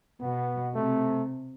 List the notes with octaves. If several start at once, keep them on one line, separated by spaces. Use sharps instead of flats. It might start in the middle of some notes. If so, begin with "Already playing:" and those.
B2 B3
C3 A3